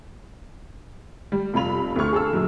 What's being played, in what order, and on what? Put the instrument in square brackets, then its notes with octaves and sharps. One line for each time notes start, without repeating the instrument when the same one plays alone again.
[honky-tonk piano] G3
F1 F4 B5 F7
D2 A3 F4 C#6 F6
G#4 A4 E6
A#1 F#3